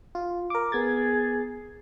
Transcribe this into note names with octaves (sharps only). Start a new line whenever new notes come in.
F4
A#4 D6
B3 G#4 G#6 A6